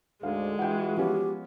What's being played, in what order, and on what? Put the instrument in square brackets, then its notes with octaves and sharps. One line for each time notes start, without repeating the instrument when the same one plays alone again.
[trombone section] D2 G#2 D3 [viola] G#3 [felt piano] F5
[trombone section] E3 F4 F#4 [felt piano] F#5 G5
[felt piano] F3 B3 C#4 [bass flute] G4